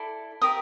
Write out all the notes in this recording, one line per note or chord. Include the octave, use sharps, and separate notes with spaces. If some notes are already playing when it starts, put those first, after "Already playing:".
Already playing: E4 A4 D5
G4 A#4 D5 D#6